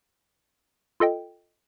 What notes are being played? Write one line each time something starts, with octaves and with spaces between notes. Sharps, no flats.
F4 A4 D#5 G5